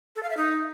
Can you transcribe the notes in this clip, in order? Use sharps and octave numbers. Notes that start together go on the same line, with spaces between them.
A4
F5
E5
D#4